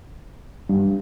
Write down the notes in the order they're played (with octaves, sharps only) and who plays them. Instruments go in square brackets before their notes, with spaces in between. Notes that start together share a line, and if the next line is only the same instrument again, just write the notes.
[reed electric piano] G2